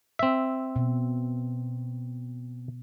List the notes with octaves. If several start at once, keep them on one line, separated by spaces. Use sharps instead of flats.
C4 E5
B2